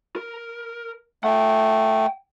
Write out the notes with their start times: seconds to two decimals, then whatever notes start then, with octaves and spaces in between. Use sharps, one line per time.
0.16 A#4
1.24 A3 F#5 G5